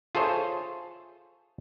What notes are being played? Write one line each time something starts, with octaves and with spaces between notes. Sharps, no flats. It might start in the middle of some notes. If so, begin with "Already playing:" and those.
F4 G#4 A4 C5 C#5 E5